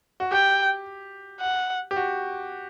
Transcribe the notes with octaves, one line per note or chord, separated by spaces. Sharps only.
F#4
G4 G5
F#5
G4
F#4